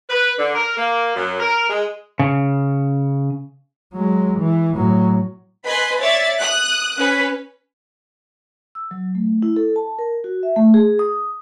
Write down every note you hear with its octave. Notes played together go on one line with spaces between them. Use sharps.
B4
D3
A#4
A#3
F#2
A#4
G#3
C#3
F#3 G#3
E3
A2 F#3
B4 D#5 G#5 B5 C6
C#5 D5 E5 A6
D#6 F#6
C#4 B4
E6
F#3
A3
E4
A4
A5
A#4
F#4
E5
A3
G#4
D#6